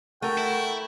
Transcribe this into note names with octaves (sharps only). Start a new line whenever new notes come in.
A3 F#4 A#4 G5
E4